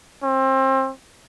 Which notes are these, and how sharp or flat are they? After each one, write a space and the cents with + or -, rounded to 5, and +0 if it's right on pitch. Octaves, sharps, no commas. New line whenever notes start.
C4 +30